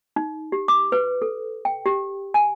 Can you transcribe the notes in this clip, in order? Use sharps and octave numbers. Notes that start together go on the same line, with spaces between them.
D#4
G4
D6
B4
A4
G5
G4
G#5